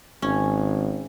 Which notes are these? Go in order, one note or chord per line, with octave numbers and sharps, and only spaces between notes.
G#1 C#4